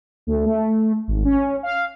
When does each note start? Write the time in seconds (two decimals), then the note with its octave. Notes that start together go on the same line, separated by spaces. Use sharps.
0.27 D2
0.46 A3
1.08 G#1
1.25 C#4
1.63 F5